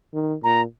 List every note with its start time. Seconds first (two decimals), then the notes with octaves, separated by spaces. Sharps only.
0.14 D#3
0.43 A#2 A#5